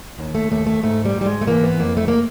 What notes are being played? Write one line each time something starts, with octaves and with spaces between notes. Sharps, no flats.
D#2
A3
D#2 A3
A3
G#2 A3
G3
G#2 G3
G#3
A3
E3 A#3
B3
F2 A#3
A3
A#3